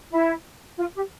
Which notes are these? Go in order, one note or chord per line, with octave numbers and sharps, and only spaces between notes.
E4
F4
G4